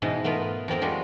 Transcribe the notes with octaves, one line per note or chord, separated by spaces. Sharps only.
G#2 B2 E3 D#4
A3 B3 F4 A#4 B4
F2 B3 C4 A#4
F3 G3 G#3 F#4